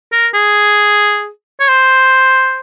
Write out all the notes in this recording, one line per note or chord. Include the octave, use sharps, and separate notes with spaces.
A#4
G#4
C#5
C5